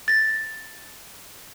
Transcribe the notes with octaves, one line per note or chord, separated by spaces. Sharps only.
A6 A#6